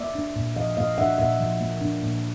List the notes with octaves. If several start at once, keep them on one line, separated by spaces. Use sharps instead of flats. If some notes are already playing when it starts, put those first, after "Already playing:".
Already playing: A#3 D5 E5
D4
A#2
F3 D#5 F5
A#3 D#5 F5
D4 E5 F#5
A#2 E5 F#5
F3
A#3
D4
A#2